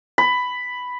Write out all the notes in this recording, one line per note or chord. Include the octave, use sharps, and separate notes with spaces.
B5